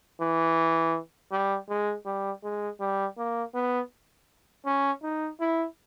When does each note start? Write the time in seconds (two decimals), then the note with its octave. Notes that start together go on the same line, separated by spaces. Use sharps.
0.20 E3
1.32 G3
1.69 G#3
2.05 G3
2.43 G#3
2.80 G3
3.17 A#3
3.54 B3
4.66 C#4
5.03 D#4
5.40 E4